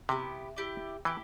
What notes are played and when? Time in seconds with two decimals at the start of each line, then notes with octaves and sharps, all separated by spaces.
0.09 C3 B3 E4 G4
0.56 E4 G4 D5
1.05 E3 E4 G4